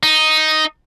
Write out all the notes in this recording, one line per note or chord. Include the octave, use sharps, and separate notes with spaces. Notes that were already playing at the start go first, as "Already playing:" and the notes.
D#4